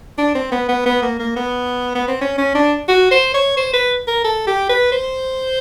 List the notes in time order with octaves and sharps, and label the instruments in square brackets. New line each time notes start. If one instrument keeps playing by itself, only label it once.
[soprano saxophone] D4
C4
B3
B3
B3
A#3
A#3
B3
B3
C4
C#4
C#4
D4
F#4
C5
C#5
C5
B4
A#4
A4
G4
B4
C5